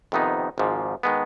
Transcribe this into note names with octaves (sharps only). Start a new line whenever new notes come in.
F2 C3 D#3 B3 D#4
G#1 G#2 F3
D#3 G#3 B3